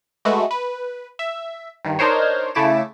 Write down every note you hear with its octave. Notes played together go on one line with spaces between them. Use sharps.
G#3 A3 F#4 B4
B4
E5
G2 D#3
D4 D#4 A#4 C5 C#5
C#3 A3 E4 D6 E7